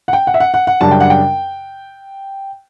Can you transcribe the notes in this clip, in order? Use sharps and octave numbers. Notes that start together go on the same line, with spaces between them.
F#5
G5
F#5
E5
F#5
F#5
F#5
F#2 C#3 G3 D4 A5
G5
F#5
G5